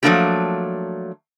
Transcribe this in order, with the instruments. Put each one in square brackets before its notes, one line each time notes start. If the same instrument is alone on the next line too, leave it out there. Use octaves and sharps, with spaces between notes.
[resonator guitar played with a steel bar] F3 F#3 A3 A#3 D4 G4